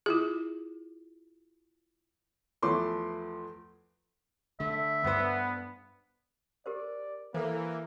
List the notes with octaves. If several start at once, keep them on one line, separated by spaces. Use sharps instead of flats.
E4 F4 G#4
E2 F3 A3 B4 C6 D6
D3 A3 E5
G2 B3 C5
G4 A#4 C5 D5
E3 A#3 A4 B4 C5